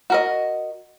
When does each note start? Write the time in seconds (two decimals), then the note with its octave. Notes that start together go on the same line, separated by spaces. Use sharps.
0.10 F#4 A#4 D#5